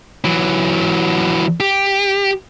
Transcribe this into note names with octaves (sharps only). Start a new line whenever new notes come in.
E3 F#3
G4